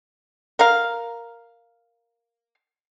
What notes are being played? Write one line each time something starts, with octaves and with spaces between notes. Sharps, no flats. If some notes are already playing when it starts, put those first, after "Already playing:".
A#4 F5